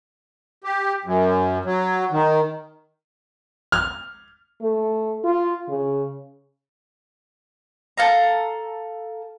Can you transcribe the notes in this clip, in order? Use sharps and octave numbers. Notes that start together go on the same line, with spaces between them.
G4
F#2
F#3
D#3
F6
A3
F4
C#3
A4 F5 A#5